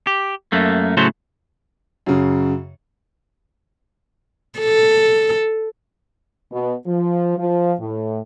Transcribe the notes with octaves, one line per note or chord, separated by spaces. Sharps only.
G4
F#2 A3 A#3
A2 C#3 F#3 A3 F#4 C5
F#2 C#3
A4
B2
F3
F3
A2